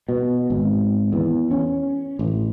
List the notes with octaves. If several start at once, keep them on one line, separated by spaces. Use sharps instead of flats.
B2
G#1
E2
C#4
A1